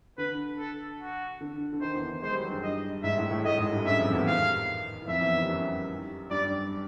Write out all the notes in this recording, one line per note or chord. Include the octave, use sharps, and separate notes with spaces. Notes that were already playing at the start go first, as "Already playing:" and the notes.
D3 B4
A4
F#4
D3
D3
D#3 C5
E2 E3
G#3 C5
G3
F#3
G2 G3
D#5
G#2 G#3 E5
A2 A3
A2 A3
A2 A3 D#5
G#2 G#3
G2 G3
F#2 F#3 E5
F2 F3
E2 E3
D#3 F5
E3
F2 F3 E5
E2 E3
D#3
G3
F#2 F#3
G2 G3 D5